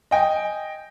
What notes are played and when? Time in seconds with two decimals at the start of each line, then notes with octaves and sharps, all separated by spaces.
0.11 D#5 G5 G#5